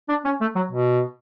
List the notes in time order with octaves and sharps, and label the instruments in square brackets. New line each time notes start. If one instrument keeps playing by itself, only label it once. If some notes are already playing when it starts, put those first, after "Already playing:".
[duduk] D4
C#4
A3
F#3
B2